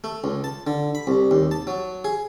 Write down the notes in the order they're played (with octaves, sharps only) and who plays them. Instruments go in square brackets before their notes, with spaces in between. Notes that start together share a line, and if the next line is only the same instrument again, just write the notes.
[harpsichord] A3
C#2
A5
D3
B5
C2
D#2
A5
F#3
G#4